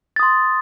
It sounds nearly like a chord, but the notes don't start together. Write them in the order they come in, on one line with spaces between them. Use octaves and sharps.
A6 D#6 C6